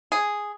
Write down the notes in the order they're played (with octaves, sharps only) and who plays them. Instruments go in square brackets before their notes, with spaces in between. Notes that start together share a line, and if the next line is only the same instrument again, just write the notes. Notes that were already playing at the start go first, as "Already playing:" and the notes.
[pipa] G#4